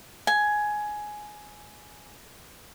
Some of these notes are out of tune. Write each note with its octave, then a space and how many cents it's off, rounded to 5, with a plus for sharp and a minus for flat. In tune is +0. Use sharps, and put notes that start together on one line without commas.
G#5 +10